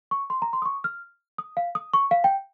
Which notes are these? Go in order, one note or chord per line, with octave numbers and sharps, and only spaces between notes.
C#6
C6
A#5
C6
D#6
C#6
F6
D#6
F5
D#6
C#6
F5
G5